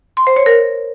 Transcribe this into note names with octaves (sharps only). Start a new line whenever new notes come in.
C6
C5
C#5
A#4